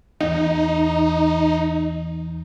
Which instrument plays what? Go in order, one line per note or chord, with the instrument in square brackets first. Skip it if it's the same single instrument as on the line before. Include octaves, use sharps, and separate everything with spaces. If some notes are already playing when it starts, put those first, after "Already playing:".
[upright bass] E2 [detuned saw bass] D#4